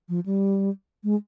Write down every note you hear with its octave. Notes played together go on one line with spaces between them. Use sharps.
F3
G3
G#3